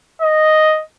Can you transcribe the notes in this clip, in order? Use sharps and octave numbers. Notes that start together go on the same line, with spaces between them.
D#5